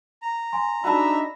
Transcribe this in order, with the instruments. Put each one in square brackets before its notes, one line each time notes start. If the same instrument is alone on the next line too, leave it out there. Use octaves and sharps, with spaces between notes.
[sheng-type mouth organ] A#5
[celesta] G#5 C6
[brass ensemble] D4 D#4 E5 [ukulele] F#4 G#4 A5 [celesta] B5